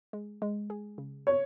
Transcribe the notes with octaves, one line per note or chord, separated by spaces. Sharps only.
G#3
G#3
G#4
C#3
C#5